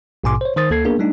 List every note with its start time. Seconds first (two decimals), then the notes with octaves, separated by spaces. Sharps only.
0.24 A#1 G#2 B2 G#5 C6 D6
0.41 C5 C#5
0.56 D#3 C5 D#6 A6
0.70 D2 A#3 A4 G#6 C7
0.85 A#3 B3 D4 G#4 A#4
0.99 G3 A3 D4 D#4